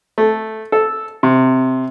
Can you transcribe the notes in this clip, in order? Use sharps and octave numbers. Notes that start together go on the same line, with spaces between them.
A3
A4
C3